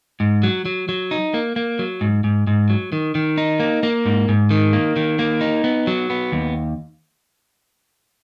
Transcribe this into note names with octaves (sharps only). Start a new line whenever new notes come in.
G#2
F#3
F#3
F#3
D#4
A#3
A#3
F#3
G#2
G#2
G#2
F#3
D#3
D#3
D#4
A#3
A#3
G#2
G#2
D#3
A#3
D#3
A#3
D#4
B3
F#3
B3
D#2